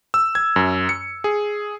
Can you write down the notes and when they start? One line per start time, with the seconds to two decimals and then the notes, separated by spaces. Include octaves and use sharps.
0.14 E6
0.35 G#6
0.56 F#2
0.89 C#7
1.24 G#4